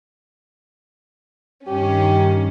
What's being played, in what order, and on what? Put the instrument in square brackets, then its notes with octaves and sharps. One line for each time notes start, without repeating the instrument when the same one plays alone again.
[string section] G2 D#3 C#4 [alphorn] G4